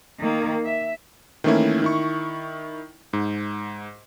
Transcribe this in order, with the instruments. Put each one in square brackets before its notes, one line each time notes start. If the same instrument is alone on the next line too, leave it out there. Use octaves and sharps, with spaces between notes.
[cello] D#3 A#3
E5
[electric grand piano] D#3 E3 A3 A#3 C#4 E4
D#3 E4 C#6
G#2